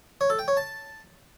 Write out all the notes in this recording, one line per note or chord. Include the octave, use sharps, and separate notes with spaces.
C#5
A4
G5
C#5
A5